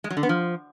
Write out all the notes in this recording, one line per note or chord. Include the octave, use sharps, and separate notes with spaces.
G#3
F#3
D3
B3
F3